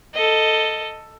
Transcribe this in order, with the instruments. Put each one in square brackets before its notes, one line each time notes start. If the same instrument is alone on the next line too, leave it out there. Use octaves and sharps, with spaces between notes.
[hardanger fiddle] A4 D#5